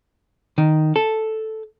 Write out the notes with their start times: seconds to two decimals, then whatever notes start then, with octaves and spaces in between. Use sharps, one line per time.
0.58 D#3
0.96 A4